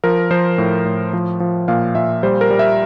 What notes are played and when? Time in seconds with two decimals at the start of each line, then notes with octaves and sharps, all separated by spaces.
0.04 F3 A#4
0.31 F3 C5
0.58 A2
0.85 A2
1.13 F3
1.40 F3
1.68 A#2 F5
1.95 A#2 E5
2.23 G3 C5
2.41 A#4
2.50 G3
2.59 E5